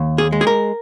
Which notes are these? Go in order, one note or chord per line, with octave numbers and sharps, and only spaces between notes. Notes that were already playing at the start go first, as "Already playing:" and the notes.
Already playing: D#2
G#4
G#3
G#4
A#4